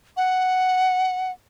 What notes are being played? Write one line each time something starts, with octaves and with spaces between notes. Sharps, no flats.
F#5